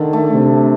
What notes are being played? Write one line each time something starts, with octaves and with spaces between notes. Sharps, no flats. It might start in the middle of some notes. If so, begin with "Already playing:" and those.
Already playing: D3 D#3
A3
C3